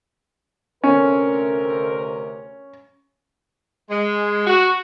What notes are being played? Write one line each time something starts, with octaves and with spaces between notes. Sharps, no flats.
D2 C3 C#4 A#4
G#3
F#4